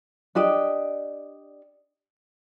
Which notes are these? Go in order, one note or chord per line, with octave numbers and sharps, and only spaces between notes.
D4 G4 D5 D#5